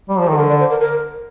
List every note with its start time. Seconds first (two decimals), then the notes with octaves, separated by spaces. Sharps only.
0.09 G3
0.19 F3 G4
0.28 D#3 A4
0.37 D3 A#4
0.49 D5
0.59 C5
0.70 A#4
0.80 A#4